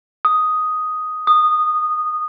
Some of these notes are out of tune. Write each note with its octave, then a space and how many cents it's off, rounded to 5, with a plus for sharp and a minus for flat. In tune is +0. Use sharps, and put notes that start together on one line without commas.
D#6 +5
D#6 -15